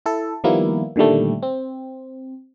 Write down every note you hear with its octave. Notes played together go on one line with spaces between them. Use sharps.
E4 A4
D#3 F3 G3 A#3 B3 E4
A#2 D3 D#3 G3 A3
C4